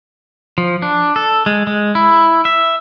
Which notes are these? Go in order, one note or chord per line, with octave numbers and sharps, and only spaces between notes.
F3
D4
A4
G#3
G#3
E4
E5